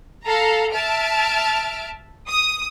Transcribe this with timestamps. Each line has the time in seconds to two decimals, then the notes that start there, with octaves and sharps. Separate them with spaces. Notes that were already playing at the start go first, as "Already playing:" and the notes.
0.24 A4 F5 A#5
0.72 E5 A5 F6 D7
2.27 D#6